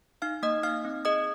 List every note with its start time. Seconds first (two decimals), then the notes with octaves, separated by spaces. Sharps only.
0.22 D#4 F5 F6
0.43 A#3 D#5 D#6
0.63 D#4 F5 F6
0.85 C4
1.05 G#4 D#5 D#6